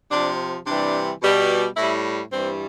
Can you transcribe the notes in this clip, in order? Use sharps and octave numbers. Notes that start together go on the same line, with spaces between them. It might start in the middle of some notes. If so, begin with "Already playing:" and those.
C3 F3 D4
C3 E3 G3 D4
B2 G3
A2 G3 E4
G2 E3 G3 C4